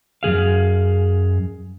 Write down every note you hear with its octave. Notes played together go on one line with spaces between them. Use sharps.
F#2 E3 G#4 F5